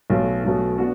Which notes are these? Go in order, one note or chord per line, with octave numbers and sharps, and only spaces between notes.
B1 B2 A3
B1 B2 A3
B3 D4 F#4